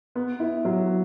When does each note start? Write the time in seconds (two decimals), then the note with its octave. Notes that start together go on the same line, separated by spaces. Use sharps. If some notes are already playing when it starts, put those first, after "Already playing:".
0.15 B3
0.40 E4
0.65 F#3